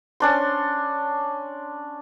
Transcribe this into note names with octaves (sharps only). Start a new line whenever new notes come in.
C#4 D4 C6